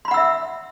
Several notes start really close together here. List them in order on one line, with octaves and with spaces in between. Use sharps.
C6 B5 F#5 E6 E5